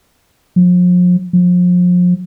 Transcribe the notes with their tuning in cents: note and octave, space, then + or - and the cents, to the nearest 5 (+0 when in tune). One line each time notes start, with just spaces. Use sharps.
F3 +40
F3 +35